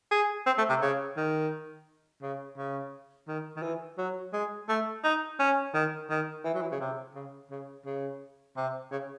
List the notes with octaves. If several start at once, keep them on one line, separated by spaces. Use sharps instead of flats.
G#4
C4
A3
C3
C#3
D#3
C#3
C#3
D#3
D#3
E3
F#3
G#3
A3
D#4
C#4
D#3
D#3
E3
F#3
E3
C#3
C3
C#3
C#3
C#3
C3
C#3